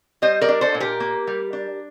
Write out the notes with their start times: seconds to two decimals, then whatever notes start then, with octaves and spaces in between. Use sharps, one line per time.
0.22 G3 C5 D#5
0.41 A#4 D5
0.49 D4
0.61 A4 C5
0.75 A#2
0.80 G4 A#4
1.00 A#3
1.27 G3
1.53 D4